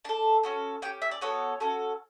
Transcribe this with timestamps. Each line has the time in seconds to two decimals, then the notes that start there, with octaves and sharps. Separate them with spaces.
0.05 D4 A4 A5
0.43 C#4 F#4 A4
0.82 C#4 G5
0.85 G4
1.02 E5
1.11 D5
1.21 B3 F#4 A4 C#5
1.60 C#4 F#4 A4